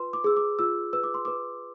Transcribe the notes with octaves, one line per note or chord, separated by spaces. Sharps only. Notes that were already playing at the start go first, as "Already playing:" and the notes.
Already playing: F4 B4 C6
D6
G#4 E6
D6
F4 E6
B4 E6
D6
C6
B4 D6